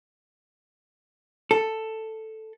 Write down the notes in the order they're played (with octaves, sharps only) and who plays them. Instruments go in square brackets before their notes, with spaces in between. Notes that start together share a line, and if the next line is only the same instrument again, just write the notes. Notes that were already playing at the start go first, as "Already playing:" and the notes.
[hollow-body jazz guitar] A4